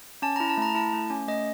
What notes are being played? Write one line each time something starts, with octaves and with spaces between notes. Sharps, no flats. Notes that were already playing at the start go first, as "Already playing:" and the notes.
C#4 A5
E4 A#5
A5
A3 A#5
E4 A5
A3
C#4
A3 D#5